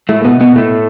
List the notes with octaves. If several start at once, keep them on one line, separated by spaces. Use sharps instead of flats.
A2 A3
B2 B3
B2 B3
A2 A3